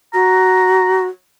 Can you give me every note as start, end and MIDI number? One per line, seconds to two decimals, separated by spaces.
0.14 1.07 66
0.14 1.03 82